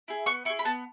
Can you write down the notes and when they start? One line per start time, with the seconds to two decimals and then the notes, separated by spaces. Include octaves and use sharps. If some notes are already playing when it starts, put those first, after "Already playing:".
0.08 E4 G#4
0.26 B3 C#6
0.45 E4 C#6
0.50 G#4
0.59 B5
0.65 B3 A5